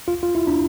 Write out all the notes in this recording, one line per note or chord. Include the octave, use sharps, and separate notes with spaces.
F4
F4
E4
D4